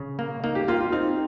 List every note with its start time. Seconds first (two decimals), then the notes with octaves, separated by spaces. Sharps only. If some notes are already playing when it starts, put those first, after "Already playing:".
Already playing: C#3
0.19 A#3
0.44 A#3 D#4
0.55 G4
0.68 A#3 F4
0.81 F4
0.92 C4 D#4